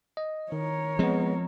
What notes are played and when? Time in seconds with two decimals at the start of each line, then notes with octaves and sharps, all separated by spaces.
0.17 D#5
0.52 D#3 A#4 C#5
0.99 F3 G#3 B3 C4